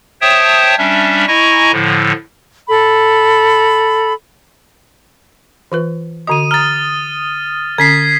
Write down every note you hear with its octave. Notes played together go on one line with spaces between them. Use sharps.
C5 C#5 E5 G5 A5 D#6
G3 C#4 D4 E5
E4 D#5 G#5 A#5 C#6
A2 D3 F3
A4 B5
E3 F4 B4
D3 F#4 D#5 D#6 D#7
A#5 F6 A6
D3 C#4 G#6 B6 C7